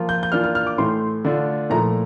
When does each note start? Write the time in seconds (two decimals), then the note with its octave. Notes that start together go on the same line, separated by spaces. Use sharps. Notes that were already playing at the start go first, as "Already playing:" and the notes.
Already playing: F3 A#3 F4
0.09 G6
0.23 G6
0.32 E3 A#3 D4 F4 F6
0.44 F6
0.55 F6
0.67 D6
0.78 A2 E3 A3 C6
1.25 D3 A3 D4 F4
1.70 A#2 F3 A3 E4 A#5